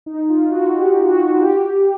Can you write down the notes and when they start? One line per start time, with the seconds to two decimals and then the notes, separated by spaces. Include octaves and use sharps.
0.06 D#4
0.29 F4
0.51 F#4
0.75 G4
1.08 F#4
1.42 G4